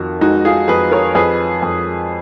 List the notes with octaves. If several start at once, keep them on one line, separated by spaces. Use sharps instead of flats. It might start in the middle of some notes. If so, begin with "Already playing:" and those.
Already playing: F2 D#3 F#4 A#4
G#3 D#4 F#4
F4 G#4
F2 G#4 B4
A#4 C#5
F2 G#4 B4
F2